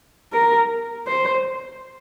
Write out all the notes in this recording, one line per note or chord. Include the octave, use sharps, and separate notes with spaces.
A#4
C5